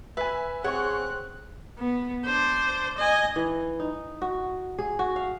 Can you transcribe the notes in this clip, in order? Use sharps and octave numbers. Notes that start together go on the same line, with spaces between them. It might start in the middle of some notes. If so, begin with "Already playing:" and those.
B4 E5 G#5
C4 G#4 C#5 F#5 C#6 F#6
B3
D4 C5
D#5 G#5
E3
D#4
F#4
G#4
F#4
F5